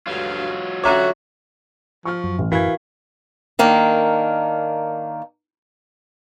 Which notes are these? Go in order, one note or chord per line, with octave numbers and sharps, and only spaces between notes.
D2 G2 F#3 F4 F5
D3 C#4 F#4 C#5 E5 A#5 D6
F3 C#6 F6
F#2 F#3
A1
F#2 E3 F#4 A#4 F5 G#6 B6
D#3 A#3 D4